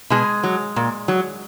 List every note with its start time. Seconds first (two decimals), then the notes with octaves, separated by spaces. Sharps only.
0.10 B2 G#3 G#4
0.43 F#3
0.76 A#2
1.08 F#3